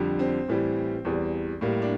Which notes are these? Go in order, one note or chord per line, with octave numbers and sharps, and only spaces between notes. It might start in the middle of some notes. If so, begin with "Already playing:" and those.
Already playing: F2 D3 G3
C4
A2 E3 G3
E2 E3 G3
A2 G3 A#3
D4